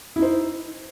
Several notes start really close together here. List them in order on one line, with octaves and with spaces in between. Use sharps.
E4 D#4 C5